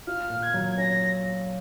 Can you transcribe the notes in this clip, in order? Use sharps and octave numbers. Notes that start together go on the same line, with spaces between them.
F4 F6
A#2
G#6
F#3
G#6
C#4 A#6